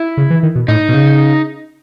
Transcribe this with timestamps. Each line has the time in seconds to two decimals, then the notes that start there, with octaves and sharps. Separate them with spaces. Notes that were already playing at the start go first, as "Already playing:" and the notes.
Already playing: E4
0.17 C#3
0.30 E3
0.43 D#3
0.55 B2
0.68 A2 D#4
0.89 B2
0.94 C#3